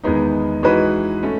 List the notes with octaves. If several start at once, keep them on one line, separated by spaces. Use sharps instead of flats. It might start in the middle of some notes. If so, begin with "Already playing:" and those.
E2 D#3 G#3 B3 D#4
E3 G#3 D#4 F#4 B4
A3 C#4